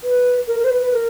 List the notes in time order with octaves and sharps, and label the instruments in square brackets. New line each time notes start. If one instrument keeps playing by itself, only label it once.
[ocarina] B4
A#4
A#4
C5
B4
B4
A#4